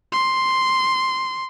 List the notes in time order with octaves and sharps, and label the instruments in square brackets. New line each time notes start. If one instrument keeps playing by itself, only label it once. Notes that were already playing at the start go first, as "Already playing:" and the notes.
[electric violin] C6